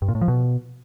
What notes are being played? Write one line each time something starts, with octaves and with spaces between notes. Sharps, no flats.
G2
A#2
A2
F3
B2